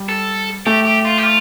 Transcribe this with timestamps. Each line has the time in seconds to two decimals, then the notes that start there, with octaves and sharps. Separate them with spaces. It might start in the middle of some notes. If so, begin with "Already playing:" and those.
Already playing: G3
0.09 A4
0.66 A3 G4
0.85 G4
1.05 F4
1.18 G4
1.23 F4